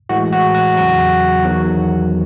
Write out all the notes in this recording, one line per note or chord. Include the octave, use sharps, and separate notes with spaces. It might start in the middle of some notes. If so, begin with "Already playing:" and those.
A2 E3 G#3 F#4
F#4
F#4
E2 C#3 F#3 F#4
E2 D#3 F#3